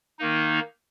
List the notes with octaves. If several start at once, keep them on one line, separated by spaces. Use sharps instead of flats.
D#3 A#3 D#4